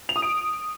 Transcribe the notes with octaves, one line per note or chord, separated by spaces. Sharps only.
F7
D#6
D7